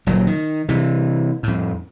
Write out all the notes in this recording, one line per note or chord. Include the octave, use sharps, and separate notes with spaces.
F#1 A#2 F#3
D#3
C3 E3
F2 A2